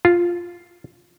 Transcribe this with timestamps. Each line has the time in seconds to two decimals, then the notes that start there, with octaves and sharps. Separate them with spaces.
0.05 F4